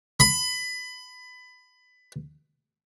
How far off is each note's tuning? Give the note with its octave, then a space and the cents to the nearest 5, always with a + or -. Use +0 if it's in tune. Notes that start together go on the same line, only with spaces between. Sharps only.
B5 +20